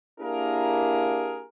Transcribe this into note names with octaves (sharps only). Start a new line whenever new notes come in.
A#3 D4 E4 G4 G#4 A#4